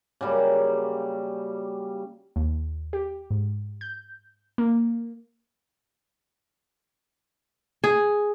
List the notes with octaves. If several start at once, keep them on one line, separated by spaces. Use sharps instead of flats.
C#3 F#3 G3 A#3
D#2
G4
G#2
G6
A#3
G#4